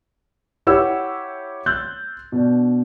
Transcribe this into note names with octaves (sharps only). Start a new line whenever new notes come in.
E4 G4 C#5 F#5 E6
C6 E6 F#6 G6 A6
B2 D4